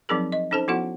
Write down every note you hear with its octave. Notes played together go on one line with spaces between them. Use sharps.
F3 F#3 C4 D#4 G#4 A#4
D#5
C#4 D#4 A4 C5 A5
F3 B3 E4 F#4 A4 F#5